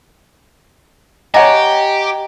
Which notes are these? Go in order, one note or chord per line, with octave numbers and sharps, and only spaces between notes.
G4 C#5 D#5 F#5 G#5 A#5 A#6